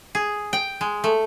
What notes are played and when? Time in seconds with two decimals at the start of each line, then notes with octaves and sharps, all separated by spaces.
0.15 G#4
0.53 G5
0.81 G#3
1.04 A3